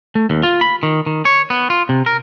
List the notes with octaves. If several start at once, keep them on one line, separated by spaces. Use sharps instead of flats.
A3
D#2
F4
B5
D#3
D#3
C#5
B3
F4
C3
A#4